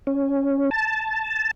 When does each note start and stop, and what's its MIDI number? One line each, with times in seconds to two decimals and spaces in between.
0.07 0.70 61
0.71 1.51 81